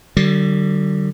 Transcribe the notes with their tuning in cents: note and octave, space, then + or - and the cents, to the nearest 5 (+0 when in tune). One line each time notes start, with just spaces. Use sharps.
D3 +35 G3 -35